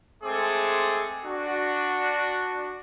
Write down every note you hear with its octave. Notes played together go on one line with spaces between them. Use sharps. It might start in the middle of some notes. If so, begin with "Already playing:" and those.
G#3 A3 C4 G#4 A4 D6
D4 F#4